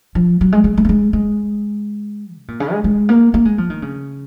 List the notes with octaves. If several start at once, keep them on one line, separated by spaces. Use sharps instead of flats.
F3
F#3
G#3
G#3
G#3
A#3
G#3
G#3
C3
A#2
C#3
G#3
G#3
A#3
A#3
G#3
F3
D#3
C#3